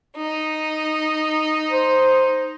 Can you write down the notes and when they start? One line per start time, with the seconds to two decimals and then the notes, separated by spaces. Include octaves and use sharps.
0.17 D#4
1.70 C5